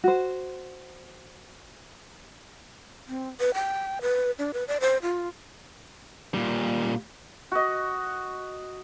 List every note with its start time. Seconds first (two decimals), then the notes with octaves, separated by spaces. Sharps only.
0.04 F#4 C5
3.07 C4
3.40 B4
3.54 G5
4.02 B4
4.39 D4
4.53 B4
4.68 D5
4.81 C5
5.02 F4
6.34 A#2 G3
7.52 F#4 D#5